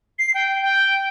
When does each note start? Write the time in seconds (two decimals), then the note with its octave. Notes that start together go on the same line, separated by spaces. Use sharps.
0.19 C7
0.34 G5
0.62 G5